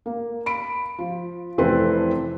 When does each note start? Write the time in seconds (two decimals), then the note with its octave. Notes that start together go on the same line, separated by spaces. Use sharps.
0.06 A#3
0.46 B5 D7
0.98 F3
1.58 F1 E3 C4 A4 B4 C6